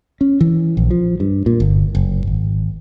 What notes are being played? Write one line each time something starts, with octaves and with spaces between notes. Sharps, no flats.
C#4
E3
A#1
F3
G2
A#2
G1
F#1
G#1